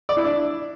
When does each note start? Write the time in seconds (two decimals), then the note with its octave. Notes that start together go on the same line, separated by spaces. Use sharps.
0.09 D5
0.17 E4
0.24 D4